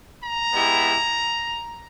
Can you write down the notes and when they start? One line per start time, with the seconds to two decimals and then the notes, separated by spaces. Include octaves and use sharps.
0.23 A#5
0.52 G#3 B3 E4 G4